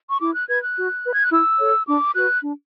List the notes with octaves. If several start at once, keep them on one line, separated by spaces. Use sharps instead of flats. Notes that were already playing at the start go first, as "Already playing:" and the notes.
C#6
E4 D6
F#6
B4 G#6
F#6
F#4
B4
G#6
F#6
E4 E6
A4 C#5
D4 D6
F#4 B4 F#6
D4